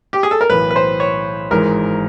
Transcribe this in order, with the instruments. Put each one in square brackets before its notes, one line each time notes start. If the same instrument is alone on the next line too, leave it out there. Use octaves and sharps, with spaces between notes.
[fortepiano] G4
G#4
A4
A#4
[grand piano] B1 A2 E3 [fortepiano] B4
[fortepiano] B4
C5
C#5
[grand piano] G#1 G#2 E3 [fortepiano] A#4